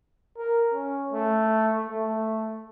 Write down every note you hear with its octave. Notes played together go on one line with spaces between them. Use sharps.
A#4
C#4
A3
A3